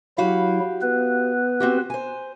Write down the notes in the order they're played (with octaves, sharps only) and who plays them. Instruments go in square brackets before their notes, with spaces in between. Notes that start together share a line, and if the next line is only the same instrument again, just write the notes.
[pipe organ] F#3 E4 [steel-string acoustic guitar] F#4 G4 F5
[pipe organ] B3 B4
[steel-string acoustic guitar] C4 F#4 G4
C5 G#5